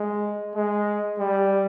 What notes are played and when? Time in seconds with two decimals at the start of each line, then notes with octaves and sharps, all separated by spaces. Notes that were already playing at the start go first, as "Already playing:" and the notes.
Already playing: G#3
0.55 G#3
1.19 G3